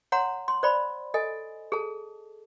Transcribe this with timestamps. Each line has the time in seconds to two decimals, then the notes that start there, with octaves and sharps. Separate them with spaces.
0.12 C#5 F#5 A#5 C6
0.48 C6
0.63 C5 D5 B5
1.14 A4 D#5 G#5
1.72 G#4 A4 A5